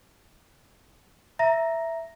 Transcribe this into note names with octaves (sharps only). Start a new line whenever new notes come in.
E5 A#5 A#6